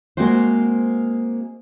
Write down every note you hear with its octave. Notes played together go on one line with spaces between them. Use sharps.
G#3 A#3 C4 F#4 C5